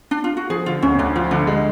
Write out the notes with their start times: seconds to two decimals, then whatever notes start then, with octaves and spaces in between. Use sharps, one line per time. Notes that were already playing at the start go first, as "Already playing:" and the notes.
0.11 D4
0.24 F4
0.37 F#4
0.50 F3 G#4
0.66 D3 F4
0.83 D2 C#4
0.99 D2 D4
1.16 F3 F4
1.31 D3 D4
1.47 G#3